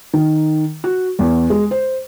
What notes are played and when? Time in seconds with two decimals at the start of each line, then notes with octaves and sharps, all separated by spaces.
0.13 D#3
0.84 F#4
1.19 E2
1.50 G#3
1.71 C5